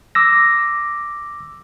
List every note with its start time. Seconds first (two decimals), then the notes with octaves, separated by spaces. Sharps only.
0.15 D6 E6 A#6